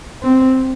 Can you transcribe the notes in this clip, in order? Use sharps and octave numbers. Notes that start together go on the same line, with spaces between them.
C4